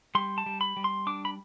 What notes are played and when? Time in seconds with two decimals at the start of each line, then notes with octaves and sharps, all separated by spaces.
0.15 G3 C6
0.38 A5
0.46 G3
0.61 B5
0.77 G3
0.84 C6
1.07 D4 D6
1.25 B5